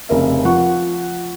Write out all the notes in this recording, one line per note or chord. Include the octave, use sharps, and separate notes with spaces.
F1 C#3 A#4 E5
F3 F#5 C#6